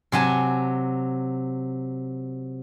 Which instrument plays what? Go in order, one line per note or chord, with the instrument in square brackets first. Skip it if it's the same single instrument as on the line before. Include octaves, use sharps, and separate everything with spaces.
[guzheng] C3 F#3 G#5 A5